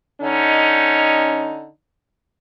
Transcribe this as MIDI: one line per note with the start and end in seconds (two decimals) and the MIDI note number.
0.21 1.67 50
0.21 1.67 61
0.21 1.67 63